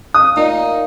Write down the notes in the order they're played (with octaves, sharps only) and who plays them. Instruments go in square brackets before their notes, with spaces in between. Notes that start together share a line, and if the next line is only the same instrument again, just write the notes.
[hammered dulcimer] F5 D6 [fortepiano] D#6
[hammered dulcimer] A#2 [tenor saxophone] D#4